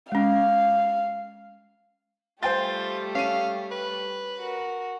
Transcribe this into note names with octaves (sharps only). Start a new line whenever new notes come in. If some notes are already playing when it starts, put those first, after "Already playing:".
G#3 C#4 F5
G3 A3 F4 G4 C5 G5 A6
C#4 F5 D#7
B4
F#4 A#4